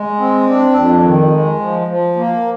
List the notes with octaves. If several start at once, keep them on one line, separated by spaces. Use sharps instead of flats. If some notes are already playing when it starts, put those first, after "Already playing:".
Already playing: G#3
C4
D4
F2
D#3
G#3
F3
F3
A#3